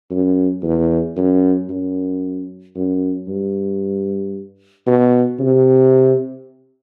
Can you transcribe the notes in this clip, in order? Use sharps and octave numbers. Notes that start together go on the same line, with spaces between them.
F#2
E2
F#2
F#2
F#2
G2
B2
C3